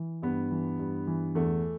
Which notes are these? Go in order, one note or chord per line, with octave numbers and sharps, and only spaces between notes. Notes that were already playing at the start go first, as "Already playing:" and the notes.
Already playing: E3
G2 B3
E3
G2
E3
E2 A3